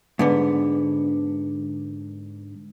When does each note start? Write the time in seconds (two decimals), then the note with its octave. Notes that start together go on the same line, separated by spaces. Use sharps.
0.19 G#2 D3 B3